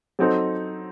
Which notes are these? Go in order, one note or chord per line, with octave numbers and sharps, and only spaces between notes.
F#3 C4 D#4 A4